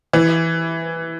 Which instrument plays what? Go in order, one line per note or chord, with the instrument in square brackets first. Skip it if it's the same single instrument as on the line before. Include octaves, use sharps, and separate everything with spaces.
[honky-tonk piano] E3